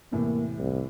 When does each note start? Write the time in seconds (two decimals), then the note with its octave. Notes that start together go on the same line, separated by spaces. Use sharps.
0.12 E2 A2 C3 A#3
0.59 C2